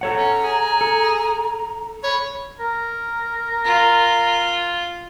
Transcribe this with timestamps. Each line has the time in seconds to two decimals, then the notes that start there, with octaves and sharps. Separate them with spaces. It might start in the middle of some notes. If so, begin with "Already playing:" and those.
0.01 A4 C#5 F#5 A#5
0.16 C#4
0.44 G#4
0.81 A4
2.04 C#5 B5
2.60 A#4
3.65 F4